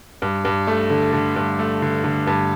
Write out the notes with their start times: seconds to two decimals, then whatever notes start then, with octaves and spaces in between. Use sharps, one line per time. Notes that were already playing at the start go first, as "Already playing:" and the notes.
0.22 G2
0.45 G2
0.67 A3
0.90 D3
1.13 D3
1.36 G2
1.59 A3
1.82 D3
2.04 D3
2.27 G2